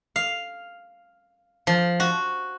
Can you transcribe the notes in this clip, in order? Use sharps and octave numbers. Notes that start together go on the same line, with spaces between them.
F5
F3
F#4